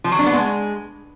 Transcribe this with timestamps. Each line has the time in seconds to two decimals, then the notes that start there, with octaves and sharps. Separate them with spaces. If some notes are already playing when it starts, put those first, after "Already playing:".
0.04 F3
0.12 F#3
0.19 D4
0.26 B3
0.33 G#3